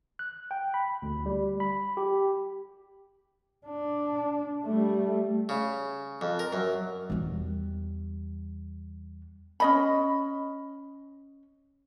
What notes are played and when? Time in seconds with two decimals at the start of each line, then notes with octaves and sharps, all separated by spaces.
0.19 F#6
0.51 G5
0.74 B5
1.02 D2
1.26 G3
1.60 B5
1.97 G4
3.66 D4
4.66 G3 A3
5.49 C#3
6.21 F2
6.39 A#4
6.53 F#2
7.10 E2 G3
9.60 C#4 D#5 B5